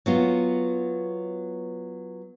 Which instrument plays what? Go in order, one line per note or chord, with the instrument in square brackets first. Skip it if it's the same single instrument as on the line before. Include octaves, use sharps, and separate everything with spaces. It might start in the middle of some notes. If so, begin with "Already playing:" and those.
[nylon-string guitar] F#3 B3 F4